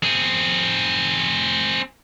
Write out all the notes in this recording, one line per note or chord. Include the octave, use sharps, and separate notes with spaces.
C4 G#4